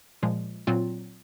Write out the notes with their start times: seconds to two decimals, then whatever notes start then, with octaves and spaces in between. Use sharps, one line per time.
0.23 A#2 F3 G#3
0.67 A#2 F#3 C4 F4